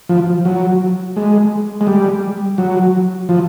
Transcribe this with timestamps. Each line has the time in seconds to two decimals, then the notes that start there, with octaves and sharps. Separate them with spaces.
0.09 F3
0.45 F#3
1.16 G#3
1.81 G#3
1.87 G3
2.58 F#3
3.29 F3